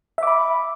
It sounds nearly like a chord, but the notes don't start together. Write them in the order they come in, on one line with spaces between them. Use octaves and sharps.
E5 D6 B5